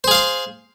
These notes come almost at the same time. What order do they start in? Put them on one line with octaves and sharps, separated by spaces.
C5 G#4 F5 C6